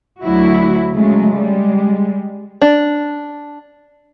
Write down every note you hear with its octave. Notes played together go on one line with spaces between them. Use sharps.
D2 F#3 E4 F#4
C#3 F#3 G#3 A3
G3 G#3
D4